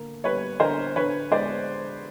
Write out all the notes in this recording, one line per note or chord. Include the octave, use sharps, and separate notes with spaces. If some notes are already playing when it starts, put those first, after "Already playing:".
Already playing: D3 A#3
G3 B4 C#5
D3 A#4 C5
D3 B4 C#5
G#3 C5 D5